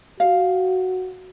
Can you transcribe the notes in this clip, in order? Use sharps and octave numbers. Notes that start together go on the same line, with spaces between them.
F#4 F5